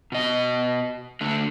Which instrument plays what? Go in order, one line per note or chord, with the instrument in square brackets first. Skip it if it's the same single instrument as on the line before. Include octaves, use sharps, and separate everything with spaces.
[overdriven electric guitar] B2 D#5
D2 D3